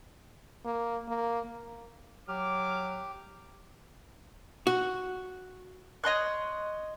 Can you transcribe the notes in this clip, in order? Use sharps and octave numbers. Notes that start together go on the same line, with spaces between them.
A#3
A#3
F#3 G4 D6 F6
F#4
C#5 D#5 C6 F#6